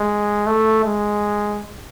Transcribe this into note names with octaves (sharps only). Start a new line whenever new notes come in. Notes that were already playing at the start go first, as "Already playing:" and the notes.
Already playing: G#3
A3
G#3